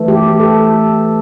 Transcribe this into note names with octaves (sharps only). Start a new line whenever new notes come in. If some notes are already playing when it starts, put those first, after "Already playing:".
Already playing: E3 A3
G4
A4